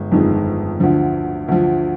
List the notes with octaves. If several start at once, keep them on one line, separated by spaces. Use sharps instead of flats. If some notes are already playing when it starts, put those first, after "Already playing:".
Already playing: G1 G#3
G1 F2 D#3 G#3
D2 D3 F3
D2 D3 F3